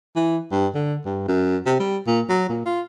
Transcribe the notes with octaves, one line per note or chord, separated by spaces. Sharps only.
E3
G2
D3
G2
F#2
C3
G3
A#2
F#3
A#2
F4